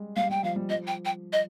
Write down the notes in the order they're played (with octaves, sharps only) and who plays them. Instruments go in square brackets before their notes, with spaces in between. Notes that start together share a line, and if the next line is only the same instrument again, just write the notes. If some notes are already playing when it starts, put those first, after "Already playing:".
Already playing: [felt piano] G3 G#3
[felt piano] G3 [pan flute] F5
[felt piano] G3 [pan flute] G5
[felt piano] F3 [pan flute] F5
[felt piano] G3
[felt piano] F3 [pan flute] D#5
[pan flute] G5
G5
D#5